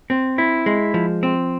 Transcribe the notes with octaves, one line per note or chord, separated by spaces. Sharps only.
C4
E4
G#3
F3
C4